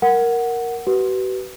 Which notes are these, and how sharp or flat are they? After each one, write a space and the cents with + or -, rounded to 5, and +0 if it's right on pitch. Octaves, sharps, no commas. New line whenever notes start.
A#4 +0 F#5 +0
F#4 +45 B4 +0